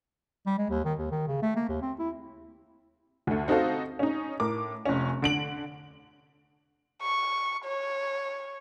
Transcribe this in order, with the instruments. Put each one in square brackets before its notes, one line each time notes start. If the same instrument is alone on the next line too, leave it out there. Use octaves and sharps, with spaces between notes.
[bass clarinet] G3
G#3
D#2
D#3
D#2
D#3
C#3
A3
A#3
D#2
C4
E4
[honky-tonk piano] D2 A3
C4 D#4 F#4 A4 F5
C#4 D#4
A2 A#4 D6
F1 C#4
D3 D7 F#7
[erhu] C#6
C#5